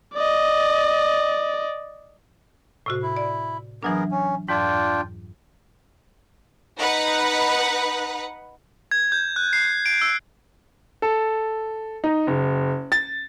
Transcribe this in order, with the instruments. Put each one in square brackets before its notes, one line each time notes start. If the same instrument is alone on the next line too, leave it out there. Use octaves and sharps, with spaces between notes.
[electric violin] D5 D#5
[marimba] A2 C3 F#4
[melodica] E4
[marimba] D5
[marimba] E3 F#3 D4 [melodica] B3 G#4 A#4
[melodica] C#4
[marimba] F2 G#2 [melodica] D4 F4 G5
[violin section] D#4 B4 F#5
[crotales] G#6
G6
F#6
C7
D7
E6
[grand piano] A4
D#4
F#1
A6